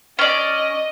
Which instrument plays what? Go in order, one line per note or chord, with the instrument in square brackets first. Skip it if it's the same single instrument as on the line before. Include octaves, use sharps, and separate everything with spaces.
[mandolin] C#4 D5 [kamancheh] D#5